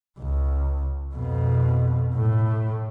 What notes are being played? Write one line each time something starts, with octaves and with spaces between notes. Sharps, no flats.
C#2
F2 B2
A2